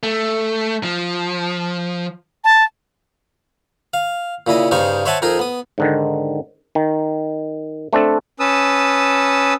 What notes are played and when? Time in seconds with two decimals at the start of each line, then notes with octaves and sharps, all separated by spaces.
0.03 A3
0.84 F3
2.44 A5
3.94 F5
4.47 A#2 C#3 E4 D#5
4.71 G2 C#3 D#4 C5 F5 C#6
5.05 C5 C#5 E5 F#5 G#5 A5
5.22 F2 D#4 G#4 A#4 D#6
5.39 B3 D#6
5.78 G#2 D3 D#3
6.75 D#3
7.93 A3 C4 D4 A4
8.40 C#4 B4 A5 D#6 E6